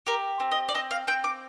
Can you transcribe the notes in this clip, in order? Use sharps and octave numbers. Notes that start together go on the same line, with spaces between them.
G4 A#4
C4
D#5
D5
C4 D#5
F5
C4 G5
D6